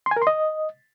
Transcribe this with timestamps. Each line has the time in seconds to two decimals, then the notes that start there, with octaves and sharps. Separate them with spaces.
0.06 C6
0.11 G#5
0.16 A#4
0.22 C6
0.27 D#5